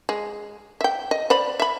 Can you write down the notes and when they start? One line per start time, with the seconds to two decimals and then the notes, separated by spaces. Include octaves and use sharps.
0.09 G#3
0.81 E5 G5
1.11 D#5
1.30 C5 D5 B5
1.60 E5 B5